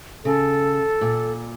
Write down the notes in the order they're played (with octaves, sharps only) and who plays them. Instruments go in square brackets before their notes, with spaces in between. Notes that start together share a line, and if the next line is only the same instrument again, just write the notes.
[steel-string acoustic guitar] C#3 [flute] A4
[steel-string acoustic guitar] A#2